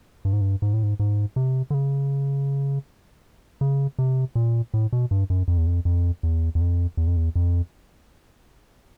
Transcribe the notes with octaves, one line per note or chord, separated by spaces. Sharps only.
G2
G#2
G2
G#2
A2
G#2
G#2
C3
D3
C#3
C#3
C3
A#2
A2
B2
G2
F#2
F2
E2
F2
F2
E2
E2
F2
E2
F2
E2
F2